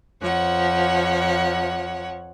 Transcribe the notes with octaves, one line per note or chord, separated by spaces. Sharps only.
F2 F3 C#5 F#5